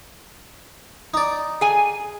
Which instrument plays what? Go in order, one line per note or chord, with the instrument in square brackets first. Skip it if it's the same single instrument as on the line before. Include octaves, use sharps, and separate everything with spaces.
[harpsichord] D#4 D5
[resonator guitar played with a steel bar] G#4 G#5